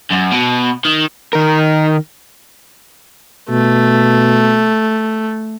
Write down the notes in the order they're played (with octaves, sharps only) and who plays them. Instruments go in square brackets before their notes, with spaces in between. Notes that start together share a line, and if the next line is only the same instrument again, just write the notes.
[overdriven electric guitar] F#2
B2
D#3
D#3 A#4
[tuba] B2 [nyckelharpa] A3